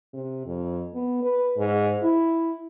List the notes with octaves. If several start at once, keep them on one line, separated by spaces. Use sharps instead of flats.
C3
F2
B3
B4
G#2
E4